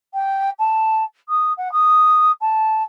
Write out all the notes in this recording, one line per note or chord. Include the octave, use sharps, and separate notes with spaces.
G5
A5
D#6
F#5
D#6
A5